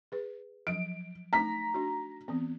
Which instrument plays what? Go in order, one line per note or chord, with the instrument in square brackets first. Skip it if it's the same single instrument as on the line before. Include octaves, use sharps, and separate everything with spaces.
[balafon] G#4 B4
[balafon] F3 F#3 [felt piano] D7
[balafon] A3 D#4 [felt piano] A#5 B6
[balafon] D4 F#4
E3 B3 C4